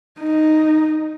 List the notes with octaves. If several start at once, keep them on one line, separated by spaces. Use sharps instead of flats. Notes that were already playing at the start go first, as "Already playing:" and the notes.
D#4